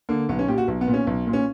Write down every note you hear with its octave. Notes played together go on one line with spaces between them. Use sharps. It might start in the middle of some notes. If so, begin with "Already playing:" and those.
D3 A#3
B1 B3
C#4
A#2 G4
F#4
B1
B3
A#2
C#4
B1
A#2
C#4